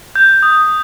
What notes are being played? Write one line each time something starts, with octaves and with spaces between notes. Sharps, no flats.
G6
D#6